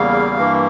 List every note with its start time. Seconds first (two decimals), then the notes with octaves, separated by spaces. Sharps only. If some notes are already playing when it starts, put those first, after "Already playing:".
Already playing: E2 C#3 G3 A#3 F5
0.37 G2 E3 A#3